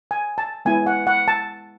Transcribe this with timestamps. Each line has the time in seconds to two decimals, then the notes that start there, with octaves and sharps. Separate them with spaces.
0.11 G#5
0.38 A5
0.65 G#3 B3 E4 G#5
0.86 F#5
1.07 F#5
1.28 A5